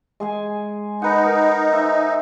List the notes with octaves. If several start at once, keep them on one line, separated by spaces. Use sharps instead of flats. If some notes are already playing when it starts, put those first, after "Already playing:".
G#3 G#4 G#5
D#4 B4 F#5
A#4
C5 E5